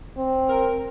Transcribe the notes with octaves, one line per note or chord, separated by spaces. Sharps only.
C4
A#4